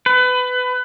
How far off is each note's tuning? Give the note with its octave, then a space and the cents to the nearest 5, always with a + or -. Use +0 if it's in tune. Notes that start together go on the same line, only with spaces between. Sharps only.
B4 +25